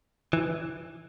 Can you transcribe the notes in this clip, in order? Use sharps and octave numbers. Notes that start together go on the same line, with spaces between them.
E3